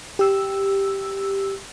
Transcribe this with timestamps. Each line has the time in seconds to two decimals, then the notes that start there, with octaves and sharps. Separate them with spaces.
0.19 G4 E6